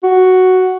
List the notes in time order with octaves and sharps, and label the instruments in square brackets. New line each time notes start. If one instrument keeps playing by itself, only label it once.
[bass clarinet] F#4